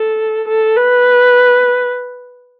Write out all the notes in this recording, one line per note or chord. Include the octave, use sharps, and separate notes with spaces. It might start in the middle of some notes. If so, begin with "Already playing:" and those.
Already playing: A4
A4
B4